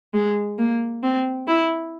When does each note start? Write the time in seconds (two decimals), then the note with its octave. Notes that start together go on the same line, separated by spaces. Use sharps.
0.14 G#3
0.58 A#3
1.03 C4
1.47 E4